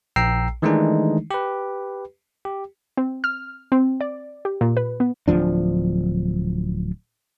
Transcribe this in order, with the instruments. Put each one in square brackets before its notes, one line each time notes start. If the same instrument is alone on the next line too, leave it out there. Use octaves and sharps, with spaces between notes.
[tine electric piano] A#1 G5 A#5 E6 C7
D#3 E3 G#3 A3 D4 D#4
G4 B4
G4
[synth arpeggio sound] C4
F6
C4
D5
G4
A#2
B4
B3
[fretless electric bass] D1 C2 F3 D4